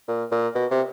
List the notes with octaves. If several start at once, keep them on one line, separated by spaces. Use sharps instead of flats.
A#2
A#2
B2
C3